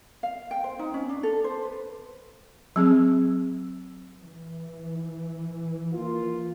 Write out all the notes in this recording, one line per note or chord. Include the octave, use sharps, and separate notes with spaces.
F5
G5
C5
D#4
C#4
D4
A4
C5
B4
F#3 C4 G#4
E3
A#3 F4